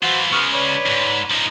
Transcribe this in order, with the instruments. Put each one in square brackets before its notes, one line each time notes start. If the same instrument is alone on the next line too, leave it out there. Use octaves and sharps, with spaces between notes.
[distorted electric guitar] E3 F4 [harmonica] F#4 C5
[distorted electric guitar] C#3 G#3 [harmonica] B3 C#6 F6
[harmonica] B4 C#5 D5
[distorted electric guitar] E2 G#2
F3 D#4